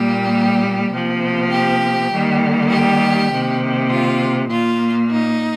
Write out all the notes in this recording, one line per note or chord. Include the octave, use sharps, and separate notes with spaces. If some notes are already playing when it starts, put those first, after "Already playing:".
Already playing: A#2 G3 A#3 G4
C3 F3 A#3
G4
D#3 G3 A#3
G4
C3 D#3 A#3
F4
A#2 A#3 F4
D#4